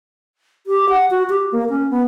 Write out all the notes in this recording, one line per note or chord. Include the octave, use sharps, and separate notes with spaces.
G4
F#5
F#4
G4
A#3
C#4
B3